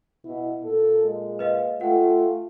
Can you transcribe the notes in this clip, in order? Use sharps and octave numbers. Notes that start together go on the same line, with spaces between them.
B2 E4
A#2 A4
G#3
B4 D#5 F5
A3 F4 F#5 G5